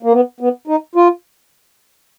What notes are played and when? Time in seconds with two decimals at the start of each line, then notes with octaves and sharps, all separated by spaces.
0.03 A#3
0.13 B3
0.40 B3
0.68 D#4
0.95 F4